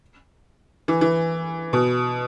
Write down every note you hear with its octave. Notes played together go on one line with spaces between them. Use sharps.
E3
E3
B2